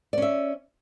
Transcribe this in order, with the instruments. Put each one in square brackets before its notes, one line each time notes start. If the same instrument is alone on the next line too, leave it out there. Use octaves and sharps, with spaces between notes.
[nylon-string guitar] D5
C#4
E5